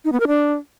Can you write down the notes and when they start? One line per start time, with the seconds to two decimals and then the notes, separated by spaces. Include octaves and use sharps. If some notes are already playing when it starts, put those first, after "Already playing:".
0.05 D#4
0.12 B3
0.20 A#4
0.28 D4